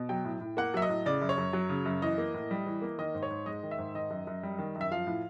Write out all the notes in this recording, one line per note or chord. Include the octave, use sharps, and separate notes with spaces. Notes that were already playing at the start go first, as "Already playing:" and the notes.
Already playing: B2
F#3 G5
A2
A2
A#3 F#5
F#3 E5
D#5
A2
C#3 D5
F#2
C#5
F#2
F#3
C#3
F#2
E3 D#5
A#3
A2
G3
E3
A#3
D#3 D#5
G#2
C#5
G#2
G#3 D#5
D#3
E5
G#2
D#3 D#5
F#2
F#2
G3
D#3
F#2
E5
F3 F5
A2